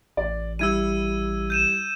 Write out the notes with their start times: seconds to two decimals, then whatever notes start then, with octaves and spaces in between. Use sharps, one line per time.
0.17 A1 D5
0.59 G3 E4 E6 G#6 D#7
1.50 G6 D#7 E7